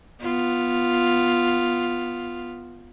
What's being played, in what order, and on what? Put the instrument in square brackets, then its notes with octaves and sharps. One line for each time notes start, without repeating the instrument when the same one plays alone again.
[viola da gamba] B3 F4